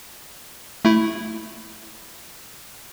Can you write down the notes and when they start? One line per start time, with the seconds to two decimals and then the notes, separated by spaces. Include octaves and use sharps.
0.85 A3 E4